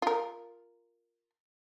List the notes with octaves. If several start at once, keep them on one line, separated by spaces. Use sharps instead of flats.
F4 A#4